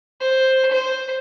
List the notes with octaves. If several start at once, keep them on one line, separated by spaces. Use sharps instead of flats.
C5
C5